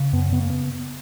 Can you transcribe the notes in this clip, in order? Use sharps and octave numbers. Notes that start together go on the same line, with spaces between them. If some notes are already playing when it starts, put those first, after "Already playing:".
Already playing: C#3
F#2 B3
C#3 B3
A#3
B3